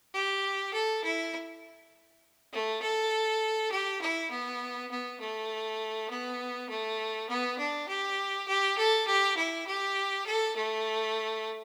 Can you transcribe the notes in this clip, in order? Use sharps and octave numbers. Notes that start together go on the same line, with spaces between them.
G4
A4
E4
A3
A4
G4
E4
B3
B3
A3
B3
A3
B3
D4
G4
G4
A4
G4
E4
G4
A4
A3